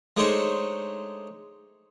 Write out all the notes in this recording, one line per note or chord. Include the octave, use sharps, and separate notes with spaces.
G#3 A3 D4 D#4 C5 C#5